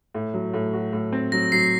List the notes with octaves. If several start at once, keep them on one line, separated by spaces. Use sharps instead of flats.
A2
F#3
A2
F#4
A2
C4
F#3 A#6
F#3 C7